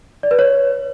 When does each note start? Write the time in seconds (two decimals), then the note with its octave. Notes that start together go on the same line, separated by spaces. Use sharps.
0.23 D5
0.31 B4
0.39 C#5